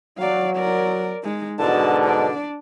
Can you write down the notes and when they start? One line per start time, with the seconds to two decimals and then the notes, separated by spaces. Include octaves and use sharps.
0.18 F#3 D5 F5
0.56 A#4 D5
1.24 G#3 D#4
1.59 G#2 B2 D3 F#4 A5
2.05 D4 D5